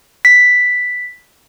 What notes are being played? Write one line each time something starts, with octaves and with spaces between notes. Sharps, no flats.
B6